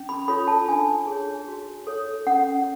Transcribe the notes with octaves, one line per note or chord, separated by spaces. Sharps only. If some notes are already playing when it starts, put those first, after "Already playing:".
Already playing: C#4
B5
F4 A4 C#5 B5
A5
D4 G#5
G#4 C#5
F#4
A4 C#5
C#4 F#5